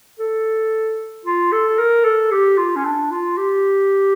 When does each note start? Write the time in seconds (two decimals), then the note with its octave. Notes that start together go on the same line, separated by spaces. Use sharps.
0.19 A4
1.25 F4
1.52 A4
1.78 A#4
2.05 A4
2.31 G4
2.58 F4
2.76 C#4
2.85 D4
3.11 F4
3.37 G4